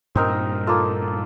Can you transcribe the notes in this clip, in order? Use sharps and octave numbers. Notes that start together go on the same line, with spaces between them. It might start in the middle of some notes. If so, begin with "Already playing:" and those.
G2 A#2 C4 D#4 A#4
A#3 F4 A4